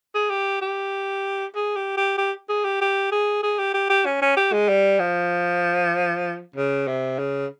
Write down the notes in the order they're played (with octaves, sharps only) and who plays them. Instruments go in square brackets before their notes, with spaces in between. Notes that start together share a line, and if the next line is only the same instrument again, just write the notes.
[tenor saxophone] G#4
G4
G4
G#4
G4
G4
G4
G#4
G4
G4
G#4
G#4
G4
G4
G4
C#4
C#4
G4
G#3
G3
F3
C#3
C3
C#3